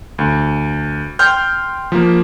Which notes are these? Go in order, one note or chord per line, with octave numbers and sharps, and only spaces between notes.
D2
G5 C6 F6 G6
F3 A#3